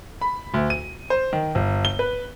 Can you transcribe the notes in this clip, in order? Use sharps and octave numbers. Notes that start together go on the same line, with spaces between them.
B5
D2
D#7
C5
D#3
G1
G7
B4